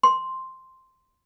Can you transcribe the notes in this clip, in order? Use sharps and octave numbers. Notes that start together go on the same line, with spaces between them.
C6